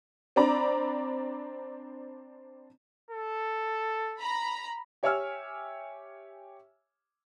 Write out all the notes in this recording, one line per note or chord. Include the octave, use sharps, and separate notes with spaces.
C4 D4 D5 A#5 B5
A4
A#5 B5
G4 C#5 E5 G#5 E6 F6